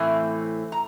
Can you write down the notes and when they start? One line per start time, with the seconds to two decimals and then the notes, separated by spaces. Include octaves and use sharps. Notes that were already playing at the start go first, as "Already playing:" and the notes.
Already playing: A2 E3 A3 C4
0.72 A#5